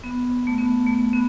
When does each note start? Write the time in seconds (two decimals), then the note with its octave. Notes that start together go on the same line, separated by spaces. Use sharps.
0.04 B3
0.47 A3
0.58 B3
0.86 A3
1.13 B3